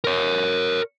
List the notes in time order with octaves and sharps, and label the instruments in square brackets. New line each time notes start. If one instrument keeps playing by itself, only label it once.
[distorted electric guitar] A#4 C#5